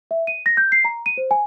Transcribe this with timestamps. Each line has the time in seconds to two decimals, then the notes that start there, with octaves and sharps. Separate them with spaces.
0.11 E5
0.27 D#7
0.46 A#6
0.57 G6
0.72 C7
0.85 A#5
1.06 D#7
1.18 C5
1.31 G#5